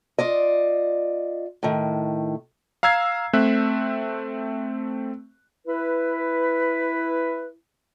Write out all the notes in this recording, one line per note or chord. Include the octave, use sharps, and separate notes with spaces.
F4 D5 D#5
A2 D#3
F5 A#5 E6 G#6 C7
A3 C4 E5 F#6
E4 B4